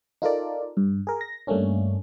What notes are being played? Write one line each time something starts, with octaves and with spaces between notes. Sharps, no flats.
D#4 F4 A4 A#4 D5
G2
G#4 A#4
A#6
G2 A3 A#3 C#4 D4